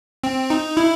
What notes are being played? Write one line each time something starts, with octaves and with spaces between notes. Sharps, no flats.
C4
D#4
E4